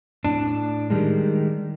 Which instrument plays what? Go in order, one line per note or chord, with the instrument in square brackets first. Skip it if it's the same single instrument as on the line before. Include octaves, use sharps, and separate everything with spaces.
[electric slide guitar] A2 D4
D#3 G3 G#3